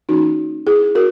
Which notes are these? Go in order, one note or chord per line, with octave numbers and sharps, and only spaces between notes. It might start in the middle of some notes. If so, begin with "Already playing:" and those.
E3 A#3 C#4 D#4 F#4
E4 G#4
F#4 A#4